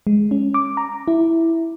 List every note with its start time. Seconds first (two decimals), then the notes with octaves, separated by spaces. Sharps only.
0.07 G#3
0.31 C#4
0.54 D6
0.77 A#5
1.08 E4